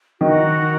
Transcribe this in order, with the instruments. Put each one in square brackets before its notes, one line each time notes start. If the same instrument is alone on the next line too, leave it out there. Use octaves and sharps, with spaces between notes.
[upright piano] D#3 [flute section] F#4 A#4 D#5 F#5